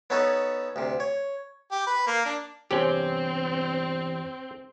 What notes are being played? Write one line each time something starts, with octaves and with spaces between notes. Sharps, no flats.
B3 C#4 D#4 A4 B4 C#5
D2 C3
C#5
G4
B4
A#3
D4
E2 G2 C3 C4 C#4 G4